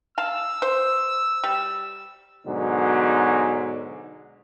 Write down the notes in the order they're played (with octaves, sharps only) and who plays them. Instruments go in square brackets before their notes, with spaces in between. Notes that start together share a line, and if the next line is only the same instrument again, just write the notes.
[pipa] F5 A5 [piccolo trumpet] E6
[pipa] C5
G3
[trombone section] G#2 B2 D3 F#3